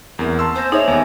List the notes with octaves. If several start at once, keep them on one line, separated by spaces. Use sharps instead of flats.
E2 A#3 C4 A#4 A#5
A5 C6 E6
C5 G#5 A#6
D#4 G#4 C#5 D#5 E5
D#2 B3 B4 G#5